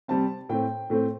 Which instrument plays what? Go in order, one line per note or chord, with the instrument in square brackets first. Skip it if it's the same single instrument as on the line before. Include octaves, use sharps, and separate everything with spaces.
[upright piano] C3 G3 C4 A5
A2 A3 C4 G5
A2 A3 C4